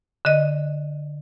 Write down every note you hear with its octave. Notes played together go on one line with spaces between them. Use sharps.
D3 D#5